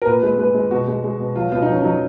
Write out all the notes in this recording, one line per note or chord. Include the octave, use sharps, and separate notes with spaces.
A#4
A#2 B4
G#3 B4
G#3 B4
G#3
B2 F#4
G#3
G#3
B2
F#3 F4
B2 F4
D#4
F#3 C#4
F#3 D#4